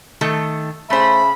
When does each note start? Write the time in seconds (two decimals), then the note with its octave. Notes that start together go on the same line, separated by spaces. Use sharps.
0.21 D#3 A3 A4
0.90 C#3 A3 C5 E5 B5